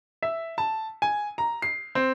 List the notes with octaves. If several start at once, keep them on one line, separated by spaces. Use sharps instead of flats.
E5
A5
G#5
A#5
C7
C4